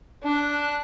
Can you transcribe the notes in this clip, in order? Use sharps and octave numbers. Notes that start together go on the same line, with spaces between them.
D4 F#6